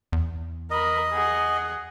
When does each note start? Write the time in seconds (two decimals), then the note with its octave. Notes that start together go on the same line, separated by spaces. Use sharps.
0.12 E2
0.71 A#4 D#5 B5
1.13 G#4 F#5